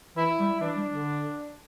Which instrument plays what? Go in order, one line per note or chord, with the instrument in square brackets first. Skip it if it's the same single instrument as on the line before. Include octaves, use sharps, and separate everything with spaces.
[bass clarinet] E3 [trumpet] E4
[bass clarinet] G3
[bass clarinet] E3 [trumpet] D4
[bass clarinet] G3
D3